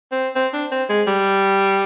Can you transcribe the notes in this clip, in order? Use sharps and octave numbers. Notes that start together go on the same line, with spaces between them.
C4
C4
D4
C4
G#3
G3